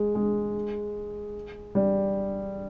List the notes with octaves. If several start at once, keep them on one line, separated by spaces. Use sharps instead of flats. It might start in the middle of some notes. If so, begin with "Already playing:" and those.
Already playing: G#3
G#3
G3